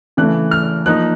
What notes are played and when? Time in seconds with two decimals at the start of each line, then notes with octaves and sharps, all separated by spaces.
0.17 C#3 E3 A3 F#6
0.51 F6
0.86 F3 A#3 D#4 F#6